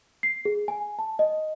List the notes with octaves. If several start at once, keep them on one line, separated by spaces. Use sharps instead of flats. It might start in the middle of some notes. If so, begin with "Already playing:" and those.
C7
G#4
G#5
A5
D#5